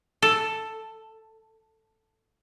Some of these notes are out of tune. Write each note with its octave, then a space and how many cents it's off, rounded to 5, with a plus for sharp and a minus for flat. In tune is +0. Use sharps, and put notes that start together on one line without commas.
A4 +5